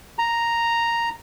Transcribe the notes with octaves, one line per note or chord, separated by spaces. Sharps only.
A#5